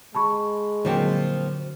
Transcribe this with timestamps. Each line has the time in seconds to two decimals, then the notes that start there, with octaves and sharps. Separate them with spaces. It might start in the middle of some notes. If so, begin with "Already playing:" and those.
0.15 G#3 A5 B5 C#6
0.85 A#2 D3 F3 F#3 C4 F#4